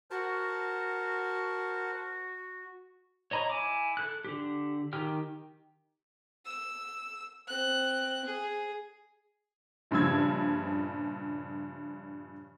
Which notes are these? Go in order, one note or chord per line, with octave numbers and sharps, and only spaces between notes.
F#4 A#4 C5 A5
C#5 D#5 A#5 B5 C#6
E4 G#5 D6
A4 F#6
D3 G4
D#3 G4 G5 F6
E6
C4 F#6
G#4
A#1 G2 C#3 F3 E6 G#6